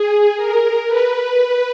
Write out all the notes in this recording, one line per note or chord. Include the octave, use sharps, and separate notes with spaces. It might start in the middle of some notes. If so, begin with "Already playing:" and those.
Already playing: G#4
A#4
B4